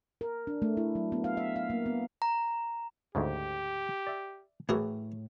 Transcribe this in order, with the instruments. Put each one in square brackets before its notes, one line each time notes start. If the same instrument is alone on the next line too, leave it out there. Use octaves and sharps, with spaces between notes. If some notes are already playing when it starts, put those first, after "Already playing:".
[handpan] A#4
D4
A3
E4
F#3
B3
F5
E5
F5
A#3
B3
[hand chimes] A#5
[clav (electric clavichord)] D2 G#2 C#3 [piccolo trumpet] G4
[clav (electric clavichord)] D5 E5
[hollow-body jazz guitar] A2 [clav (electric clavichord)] E3 [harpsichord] F#4 G#4 A#4